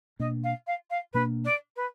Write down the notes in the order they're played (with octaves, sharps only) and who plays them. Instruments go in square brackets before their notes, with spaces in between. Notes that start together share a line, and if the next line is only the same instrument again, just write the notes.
[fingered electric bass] B2 A#3 D4 [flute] D#5
[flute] F5
F5
F5
[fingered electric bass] B2 A#3 D4 [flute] B4
[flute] D5
B4